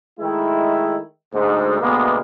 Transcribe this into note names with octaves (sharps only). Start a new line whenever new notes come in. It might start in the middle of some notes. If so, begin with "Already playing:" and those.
D#3 G#3 A3 E4
D2 G#2
D2 B2 G#3 A#3 B3